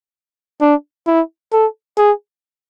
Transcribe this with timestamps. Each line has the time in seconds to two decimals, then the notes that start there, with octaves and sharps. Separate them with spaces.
0.61 D4
1.07 E4
1.52 A4
1.98 G#4